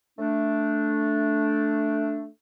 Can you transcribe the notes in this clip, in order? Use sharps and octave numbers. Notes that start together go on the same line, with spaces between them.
A3 D4